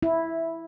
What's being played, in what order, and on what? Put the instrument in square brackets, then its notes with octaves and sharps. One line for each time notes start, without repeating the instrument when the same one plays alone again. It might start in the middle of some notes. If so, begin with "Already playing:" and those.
[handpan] E4